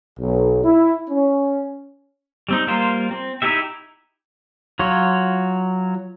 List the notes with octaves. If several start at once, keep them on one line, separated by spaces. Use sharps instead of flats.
B1
E4
C#4
G3 C4 D#4
G3 A#3 F4 A#4 C5
C4
D#4 E4 G4 E5
F#3 F4 C#5